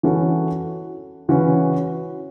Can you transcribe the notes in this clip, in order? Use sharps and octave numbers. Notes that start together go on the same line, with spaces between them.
E3 C#4 F#4 A4
C#3 E3 C#4 F#4 B4